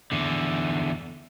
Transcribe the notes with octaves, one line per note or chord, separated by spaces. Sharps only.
E2 D3